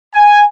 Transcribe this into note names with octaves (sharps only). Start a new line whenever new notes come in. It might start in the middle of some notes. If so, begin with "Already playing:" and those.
G#5